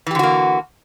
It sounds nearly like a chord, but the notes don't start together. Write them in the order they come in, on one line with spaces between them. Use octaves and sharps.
E3 G4 D3 F#4 A#3